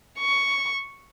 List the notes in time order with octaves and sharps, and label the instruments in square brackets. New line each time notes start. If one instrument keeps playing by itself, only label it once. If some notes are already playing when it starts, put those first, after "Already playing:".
[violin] C#6